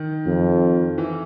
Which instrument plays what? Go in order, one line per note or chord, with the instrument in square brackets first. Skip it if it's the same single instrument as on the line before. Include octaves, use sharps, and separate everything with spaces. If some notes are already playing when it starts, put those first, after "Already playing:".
Already playing: [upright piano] D#3
[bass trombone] F2
[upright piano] E3